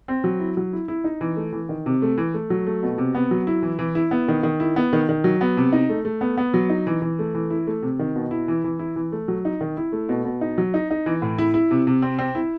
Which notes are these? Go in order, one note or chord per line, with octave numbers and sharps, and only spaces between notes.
C4
F#3
E4
F#3
E4
E4
D#4
E3
A3
E3
D#3
C3
A3
E3
A3
F#3
A3
B2
C3
B3
F#3
E4
E3
E3
E4
B3
D#3
D#3
E4
B3
D#3
D#3
F#3
B3
C3
D#4
A3
A3
B3
B3
F#3
D#4
E3
E3
A3
E3
E4
A3
C3
D#3
B2
E4
E3
E3
E4
E3
A3
F#3
D#4
D#3
E4
A3
B2
B2
D#4
F#3
D#4
D#4
E3
A2
E4
E4
C3
C3
C4
C4
E4